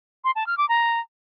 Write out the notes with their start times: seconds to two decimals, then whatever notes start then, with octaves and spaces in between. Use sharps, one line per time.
0.24 C6
0.35 A5
0.47 F6
0.58 D6
0.69 A#5